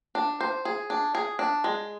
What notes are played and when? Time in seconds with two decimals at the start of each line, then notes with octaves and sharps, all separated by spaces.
0.15 D4
0.40 C5
0.65 G#4
0.90 D4
1.15 G#4
1.39 D4
1.64 G#3